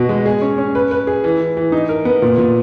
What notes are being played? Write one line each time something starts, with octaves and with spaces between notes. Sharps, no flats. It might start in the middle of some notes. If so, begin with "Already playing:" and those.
Already playing: B2 F#4
G#3
G#4
C#4
C#4
B4
B4
G#4
E3
E3
E3
D#4
A#4
B3
A#2
A#2